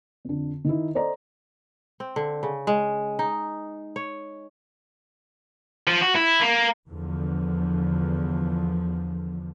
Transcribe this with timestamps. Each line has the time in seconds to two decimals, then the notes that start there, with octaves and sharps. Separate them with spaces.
0.25 F2 D3
0.64 D#3 D#4 E4
0.95 A4 C5 D5 D#5 A#5
2.00 C4
2.16 D3
2.43 C#3
2.67 G#3
3.19 D#4
3.96 C#5
5.87 F3
6.01 F#4
6.15 E4
6.41 A#3
6.88 E2 D3 F3